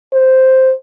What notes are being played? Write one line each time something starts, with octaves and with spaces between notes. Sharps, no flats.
C5